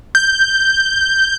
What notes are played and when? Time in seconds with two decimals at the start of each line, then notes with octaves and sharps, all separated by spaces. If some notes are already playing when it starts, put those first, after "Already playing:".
0.15 G6